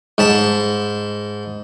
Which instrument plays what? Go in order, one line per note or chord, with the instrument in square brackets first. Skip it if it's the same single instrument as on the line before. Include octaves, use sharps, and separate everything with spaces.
[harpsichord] G#2 A5 B5